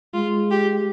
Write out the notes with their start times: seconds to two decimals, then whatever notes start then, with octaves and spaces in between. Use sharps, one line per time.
0.14 G#3 F4
0.51 G4